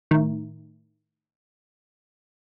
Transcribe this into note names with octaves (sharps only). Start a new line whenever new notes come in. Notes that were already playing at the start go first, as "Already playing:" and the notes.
A2 D#3